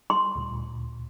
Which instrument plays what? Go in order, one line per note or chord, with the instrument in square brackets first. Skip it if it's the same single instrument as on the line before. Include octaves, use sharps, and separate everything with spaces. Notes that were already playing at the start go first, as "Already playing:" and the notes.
[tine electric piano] G3 [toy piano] C6
[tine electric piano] D2 A#2